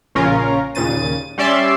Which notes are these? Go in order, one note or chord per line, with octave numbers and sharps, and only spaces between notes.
A#1 C#3 C#4 F4 A#4
D#2 A#2 C#3 A6 D#7
G3 C#4 D5 E5 C6